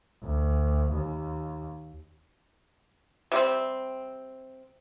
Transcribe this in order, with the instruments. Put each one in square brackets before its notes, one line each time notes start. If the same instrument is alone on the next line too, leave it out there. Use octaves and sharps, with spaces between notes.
[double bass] D2
D#2
[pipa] C3 G3 C4